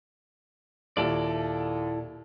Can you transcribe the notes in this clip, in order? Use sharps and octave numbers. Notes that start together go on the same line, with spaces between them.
D#2 A#2 E4 A4 D5